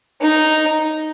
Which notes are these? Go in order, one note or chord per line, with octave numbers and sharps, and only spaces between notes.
D#4